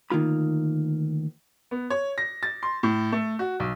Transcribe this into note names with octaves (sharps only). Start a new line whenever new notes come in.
D2 D#3 A#3 F4 B5
B3
C#5
A#6
A6
C6
A2
A3
F#4
B1